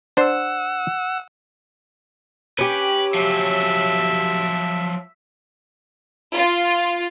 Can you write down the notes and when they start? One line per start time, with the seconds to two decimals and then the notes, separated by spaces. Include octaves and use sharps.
0.17 D4 C5 F#5 E6
2.58 C#4 G4 B4
3.14 F3 F#3 E5
6.34 F4